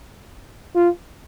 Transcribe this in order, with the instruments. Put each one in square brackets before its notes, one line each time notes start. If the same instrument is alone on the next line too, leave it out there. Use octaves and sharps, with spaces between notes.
[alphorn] F4